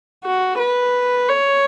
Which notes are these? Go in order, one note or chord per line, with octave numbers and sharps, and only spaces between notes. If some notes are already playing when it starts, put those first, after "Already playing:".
F#4
B4
C#5